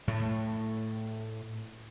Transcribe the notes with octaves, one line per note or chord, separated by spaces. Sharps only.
A2 A3